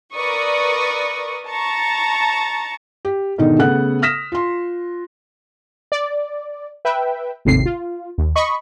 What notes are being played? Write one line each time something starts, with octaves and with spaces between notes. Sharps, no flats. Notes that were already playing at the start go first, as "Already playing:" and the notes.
A#4 B4 D5 C#6 D#6
A5 A#5 C#6 A6
G4
G#2 B2 D3 D#3 D#4
C#3 A3 B3 A4 F#5 F#6
D#6 F6 A#6 B6 E7
F4 C6
D5
B4 E5 G5
G#1 D#2 A2 C3 C7
F4
D#2
D#5 B5 C#6